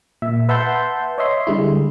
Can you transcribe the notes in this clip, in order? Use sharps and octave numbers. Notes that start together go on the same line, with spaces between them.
A#2 E5
B4 E5 F#5 A5 C6 G6
C#5 D#5 E5 C6
D3 G3 G#3 E4